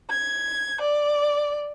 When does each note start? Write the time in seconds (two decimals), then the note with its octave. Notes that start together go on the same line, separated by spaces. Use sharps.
0.10 G#6
0.80 D5